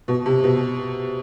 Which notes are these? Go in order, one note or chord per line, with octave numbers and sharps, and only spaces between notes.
B2
C3
B2